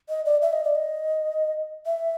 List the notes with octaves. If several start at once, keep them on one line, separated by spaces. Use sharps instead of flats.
D#5
D5
E5
D#5
D5
D#5
E5